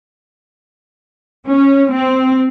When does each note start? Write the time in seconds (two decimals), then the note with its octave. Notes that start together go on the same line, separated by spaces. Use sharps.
1.49 C#4
1.93 C4